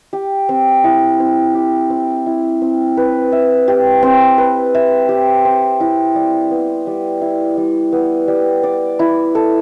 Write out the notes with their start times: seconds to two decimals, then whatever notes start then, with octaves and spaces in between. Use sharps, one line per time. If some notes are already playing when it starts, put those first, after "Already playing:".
0.13 G4
0.49 C4
0.84 E4
1.20 C4
1.54 G4
1.90 C4
2.26 E4
2.62 C4
2.97 B4
3.32 E5
3.68 G4
4.03 C4
4.38 B4
4.74 E5
5.09 G4
5.45 C4
5.80 E4
6.15 G3
6.50 B3
6.87 G3
7.21 E4
7.57 G3
7.92 B3
8.28 G3
8.63 D5
8.99 E4
9.35 A4